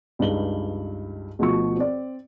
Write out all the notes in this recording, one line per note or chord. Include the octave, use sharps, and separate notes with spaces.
C#2 G2 D#4 F#7 G7
D2 B2 F3 C#6
C4 D5